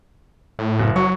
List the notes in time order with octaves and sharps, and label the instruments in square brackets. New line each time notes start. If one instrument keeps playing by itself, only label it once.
[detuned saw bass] A2
[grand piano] F#1
[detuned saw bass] F#3 [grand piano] C#6